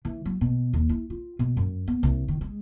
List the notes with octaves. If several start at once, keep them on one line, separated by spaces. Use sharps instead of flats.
E3
F#3
B2
D#2
E4
F4
B2
F#2
B3
C2
D#3
G#3